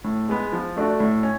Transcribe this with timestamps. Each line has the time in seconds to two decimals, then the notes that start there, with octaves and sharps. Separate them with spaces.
0.04 A2
0.29 G#3 B3
0.52 F3
0.76 A3 D4 F#4
1.00 A2
1.23 C#4